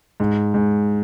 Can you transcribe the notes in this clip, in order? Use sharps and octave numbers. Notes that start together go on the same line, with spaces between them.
G#2
G#2